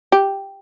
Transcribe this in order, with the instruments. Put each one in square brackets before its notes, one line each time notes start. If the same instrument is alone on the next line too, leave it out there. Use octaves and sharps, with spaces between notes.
[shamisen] G4